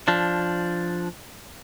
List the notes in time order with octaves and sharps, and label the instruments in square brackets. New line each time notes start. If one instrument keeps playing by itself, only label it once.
[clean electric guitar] F3 D4